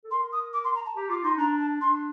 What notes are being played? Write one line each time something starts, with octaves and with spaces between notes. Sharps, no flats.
A4
A#4 C6
D#6
D6
C6
A#5
A5
G4 A#5
F4 D6
D#4 C6
D4 A#5
A5
D4 C6